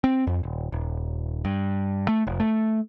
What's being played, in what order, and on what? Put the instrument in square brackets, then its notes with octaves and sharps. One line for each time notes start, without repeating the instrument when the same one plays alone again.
[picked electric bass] C4
F2
D#1
D#1
G2
A3
F1
A3